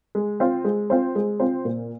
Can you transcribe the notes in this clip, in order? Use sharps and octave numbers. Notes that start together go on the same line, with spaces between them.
G#3
C4 F4 C5
G#3
C4 F4 C5
G#3
C4 F4 C5
A#2